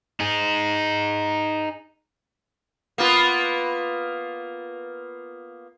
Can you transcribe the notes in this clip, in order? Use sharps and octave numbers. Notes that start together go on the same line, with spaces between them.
D#4 G#4
A#3 B3 F4